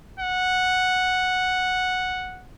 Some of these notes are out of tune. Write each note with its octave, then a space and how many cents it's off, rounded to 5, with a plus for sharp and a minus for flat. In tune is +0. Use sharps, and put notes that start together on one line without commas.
F#5 -5